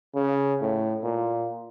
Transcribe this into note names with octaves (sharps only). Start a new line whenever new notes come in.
C#3
A2
A#2